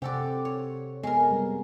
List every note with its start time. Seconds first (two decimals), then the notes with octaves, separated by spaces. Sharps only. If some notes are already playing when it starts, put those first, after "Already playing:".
0.02 C3 G4 A4 C5 D5 F#5
0.45 C#5
1.03 G#3 B3 A#4
1.31 G3 B3 C4